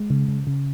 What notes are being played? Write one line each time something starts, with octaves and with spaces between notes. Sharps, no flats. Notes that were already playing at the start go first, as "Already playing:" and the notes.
Already playing: G#3
C#3
C#3
C#3